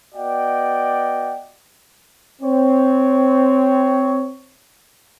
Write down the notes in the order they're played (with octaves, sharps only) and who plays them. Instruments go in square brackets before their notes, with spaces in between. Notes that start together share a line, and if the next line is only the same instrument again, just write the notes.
[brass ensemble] B3 F#4 D5 D#5 F#5 G5
C4 C#5